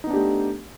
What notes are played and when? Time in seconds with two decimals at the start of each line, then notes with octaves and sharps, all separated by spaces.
0.04 D#4
0.07 B3
0.10 D4
0.13 G4
0.17 A3